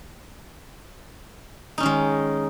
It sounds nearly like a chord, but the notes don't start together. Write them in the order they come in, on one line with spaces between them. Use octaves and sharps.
D#4 C#4 D#3 G#3